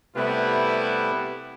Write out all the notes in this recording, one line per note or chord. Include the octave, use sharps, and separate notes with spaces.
C3 G3 A3 B3 E4 B4